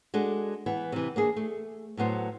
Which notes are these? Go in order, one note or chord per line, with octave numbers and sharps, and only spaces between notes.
G#3 D4 F#4 A4
E3 B3
C3 E3
A#3 D4 G#4
A3
A2 F#3 B3 C5